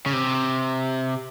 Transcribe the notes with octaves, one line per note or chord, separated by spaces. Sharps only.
C#3
C3